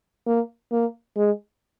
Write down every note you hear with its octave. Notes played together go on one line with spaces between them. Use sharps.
A#3
A#3
G#3